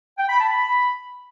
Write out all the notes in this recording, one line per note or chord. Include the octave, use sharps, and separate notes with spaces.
G5
B5
A5
B5